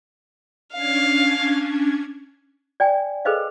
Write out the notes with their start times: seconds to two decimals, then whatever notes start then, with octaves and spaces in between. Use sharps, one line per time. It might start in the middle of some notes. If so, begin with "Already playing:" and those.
0.73 C#4 D4 F5 G#6
2.80 D5 G5 G#5
3.25 G#4 A4 B4 C5 D#5 F5